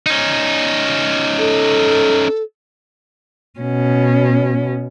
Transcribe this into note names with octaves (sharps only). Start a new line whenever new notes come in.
C#4 D#4
A4
B2 C#4